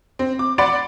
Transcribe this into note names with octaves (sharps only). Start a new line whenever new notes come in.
C4
D6
D5 F#5 B5 C6 A6 D7